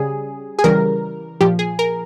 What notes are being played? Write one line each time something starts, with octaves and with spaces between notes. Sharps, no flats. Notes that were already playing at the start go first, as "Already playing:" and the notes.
Already playing: C#3 G3 G#4
G#4
C#3 E3 G3 A#4
A#2 F3 G4
G#4
A#4